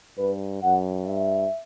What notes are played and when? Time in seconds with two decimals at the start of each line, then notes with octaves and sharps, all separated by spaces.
0.18 G2 B4
0.62 F#2 F#5
1.06 G2 E5